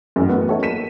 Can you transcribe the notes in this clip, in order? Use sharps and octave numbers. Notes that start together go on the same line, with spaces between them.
A1 F#2
F#3 A3 B3
D#4 A4 C#5 E5
A#3 B6 D#7 E7